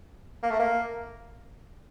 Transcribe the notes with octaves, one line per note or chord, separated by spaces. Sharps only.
A#3
A3
A#3